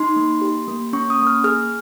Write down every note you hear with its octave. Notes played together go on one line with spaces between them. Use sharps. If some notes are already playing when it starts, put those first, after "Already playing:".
Already playing: D#4 C6
A#3
G4
A#3
C#4 C#6
D#6
A#3
F6
G#4 F6